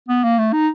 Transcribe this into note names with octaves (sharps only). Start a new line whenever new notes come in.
B3
A#3
A3
D#4